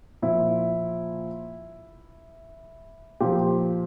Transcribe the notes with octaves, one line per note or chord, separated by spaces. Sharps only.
A#2 F3 E4
A#2 F3 G4